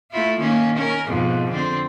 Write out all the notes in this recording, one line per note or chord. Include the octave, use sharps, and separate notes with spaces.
A3 E4 F4
D#3 A#3 C#4
C#4 A#4
F2 G#2 B2
D3 C4